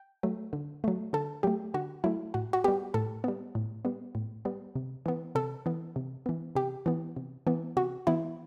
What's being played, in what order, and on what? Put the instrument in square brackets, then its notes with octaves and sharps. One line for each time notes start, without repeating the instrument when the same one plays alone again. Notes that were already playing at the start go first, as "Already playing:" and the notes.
Already playing: [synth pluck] G5
F#3 A3
D3
F#3 A3
D3 A4
F#3 A3 G4
D3 F#4
F#3 A3 E4
A2 F#4
F#4
G3 B3 G4
A2 A4
G3 B3
A2
G3 B3
A2
G3 B3
C3
E3 B3
C3 A4
E3 B3
C3
E3 B3
C3 G4
E3 B3
C3
E3 B3
C3 F#4
E3 B3 E4